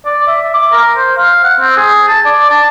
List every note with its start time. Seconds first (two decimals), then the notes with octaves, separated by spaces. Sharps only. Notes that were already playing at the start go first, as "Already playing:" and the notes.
0.05 D5
0.27 E5
0.54 D6
0.72 A#4
0.96 C5
1.17 F5
1.44 F#5
1.59 C4
1.77 G#4
2.08 A5
2.25 D5
2.50 A5